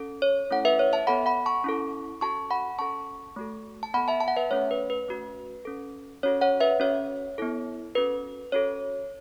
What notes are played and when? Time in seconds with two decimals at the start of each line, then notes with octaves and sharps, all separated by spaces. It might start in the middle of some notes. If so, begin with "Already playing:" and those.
Already playing: C#4 A4
0.22 C#5
0.51 A3 C#4 E4 A4 F#5
0.65 B4 E5
0.79 C#5
0.93 E5 A5
1.07 B3 A4 F#5 B5
1.26 F#5 B5
1.46 A5 C#6
1.64 C#4 E4 A4
2.21 C#4 F#4 A4 A5 C#6
2.51 F#5 B5
2.79 C#4 A4 A5 C#6
3.36 A3 F#4 A4
3.83 A5
3.94 B3 A4 F#5 B5
4.08 E5 A5
4.20 A5
4.28 F#5
4.36 B4 E5
4.51 A3 C#4 A4 C#5
4.71 B4
4.90 B4
5.08 A3 C#4 F#4
5.65 C#4 A4
6.23 C#4 F#4 A4 C#5
6.41 C#5 F#5
6.60 B4 E5
6.80 C#4 F#4 A4 C#5
7.38 B3 E4 A4
7.95 C#4 F#4 A4 B4
8.52 C#4 F#4 A4 C#5